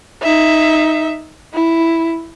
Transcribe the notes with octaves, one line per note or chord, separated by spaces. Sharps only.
D#4 E5
E4